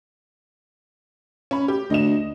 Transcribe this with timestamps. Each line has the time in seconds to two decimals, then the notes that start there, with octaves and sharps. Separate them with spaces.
1.51 C#4 B5
1.68 G4
1.90 D2 D#5 E7